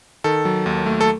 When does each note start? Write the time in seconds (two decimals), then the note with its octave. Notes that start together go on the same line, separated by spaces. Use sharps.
0.24 D#3 A4
0.45 F#3
0.66 D#2
0.86 A3
1.01 A4